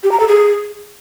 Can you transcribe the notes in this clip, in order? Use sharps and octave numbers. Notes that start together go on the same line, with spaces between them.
G4
A#5
A4
G#4